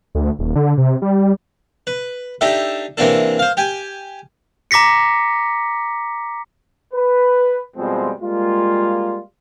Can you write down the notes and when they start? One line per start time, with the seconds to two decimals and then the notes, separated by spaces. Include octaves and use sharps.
0.15 D2
0.39 D#1
0.56 D3
0.78 C3
1.02 G3
1.87 B4
2.41 D4 D#4 G4 A4 E5
2.97 C3 E3 A#3 C4 D4 A4
3.39 C5 F5
3.57 G4 G5 G#5
4.71 A#5 D6 A#6 B6 C#7
6.93 B4
7.77 F2 B2 F3 G3 G#3 C4
8.21 G3 G#3 A#3 F4